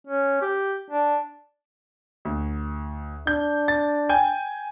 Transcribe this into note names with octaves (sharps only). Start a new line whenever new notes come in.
C#4
G4
D4
D2
D4 G6
A6
G5 G#5 G6